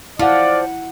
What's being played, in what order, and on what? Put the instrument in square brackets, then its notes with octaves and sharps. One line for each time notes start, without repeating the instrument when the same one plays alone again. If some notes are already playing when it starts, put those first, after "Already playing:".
[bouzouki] F3 [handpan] E4 F#5 [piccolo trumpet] D5